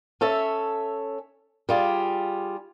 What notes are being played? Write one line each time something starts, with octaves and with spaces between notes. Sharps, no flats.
C#4 A4 C#5 E5
G3 F4 G#4